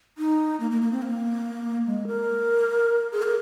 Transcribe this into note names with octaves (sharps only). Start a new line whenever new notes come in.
D#4
A#3
A#3
A#3
C4
A#3
G#3
A#4
G#4
A#4